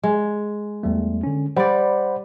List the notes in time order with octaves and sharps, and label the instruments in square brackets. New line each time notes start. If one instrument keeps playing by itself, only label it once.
[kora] G#3
[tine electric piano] E2 G3 A3
D3 C#4
[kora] G3 D5 [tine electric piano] C5 F#5 B5